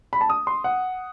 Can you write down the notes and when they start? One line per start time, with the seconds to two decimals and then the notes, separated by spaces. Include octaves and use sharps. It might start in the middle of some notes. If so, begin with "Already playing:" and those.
0.13 B5
0.21 A5
0.30 D#6
0.47 C6
0.64 F#5